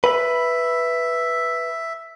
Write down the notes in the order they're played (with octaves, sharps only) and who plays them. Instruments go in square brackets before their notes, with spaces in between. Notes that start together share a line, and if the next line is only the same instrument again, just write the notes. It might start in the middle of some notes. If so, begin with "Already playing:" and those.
[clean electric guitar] B4 B5 [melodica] E5